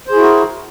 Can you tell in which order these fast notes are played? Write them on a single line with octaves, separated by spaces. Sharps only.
C5 G#4 E4 F#4 A#4